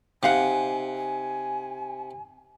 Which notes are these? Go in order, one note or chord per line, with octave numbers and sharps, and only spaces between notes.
C3 D#4 F5 F#5 G#5
G#5